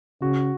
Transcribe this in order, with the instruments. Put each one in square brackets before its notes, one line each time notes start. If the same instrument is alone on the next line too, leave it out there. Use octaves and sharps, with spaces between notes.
[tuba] C#3 [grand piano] F#4